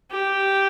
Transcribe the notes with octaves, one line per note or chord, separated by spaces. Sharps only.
G4